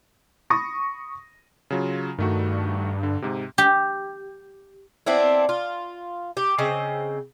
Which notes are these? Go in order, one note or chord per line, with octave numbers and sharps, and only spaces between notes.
B5 C#6 D#6 A#6
C#3 F#3 F4
G2 D#3 A3 F#4
D3
G#2 C3
G4
B3 C4 D4 E4
F4
G4
C#3 C4 D#5